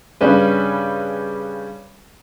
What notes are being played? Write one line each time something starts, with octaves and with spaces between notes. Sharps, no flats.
G2 C#3 G3 C#4 B4